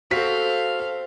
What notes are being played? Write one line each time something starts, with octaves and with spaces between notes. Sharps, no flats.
C4 F#4 A4 F5 B6